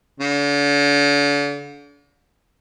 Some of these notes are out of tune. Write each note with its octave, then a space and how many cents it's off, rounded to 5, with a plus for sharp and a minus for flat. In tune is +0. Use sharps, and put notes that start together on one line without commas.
D3 -40